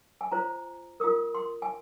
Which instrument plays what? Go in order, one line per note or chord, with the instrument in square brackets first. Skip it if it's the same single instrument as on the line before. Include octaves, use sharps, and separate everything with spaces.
[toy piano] G#5
F4 C5 A#5
F4 A#4 D#6
C6
G#5